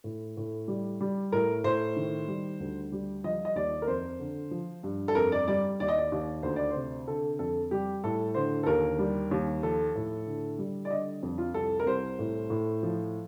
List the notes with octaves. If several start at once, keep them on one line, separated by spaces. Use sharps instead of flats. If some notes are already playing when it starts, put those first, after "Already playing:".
A2
A2
G3
G3
A2 A#4
A2 C5
D#3
G3
D2
G3
F3 D#5
D#5
D#2 D5
A#4
F2 C5
D3
F3
G2
A4
F2 A#4
D5
G3 D5
D#2 D5
D#5
D5
D#2
D2 C5
D5
C5
C3
D3 A4
F2 A4
G3 G4
A2 A4
D3 C5
A4
D#2 A#4
G3
D#2
F3 A4
A2
D3
G3
D5
D3 D#5
F2
F4
C2 A4
A#4
C2 C5
A2
A2
F3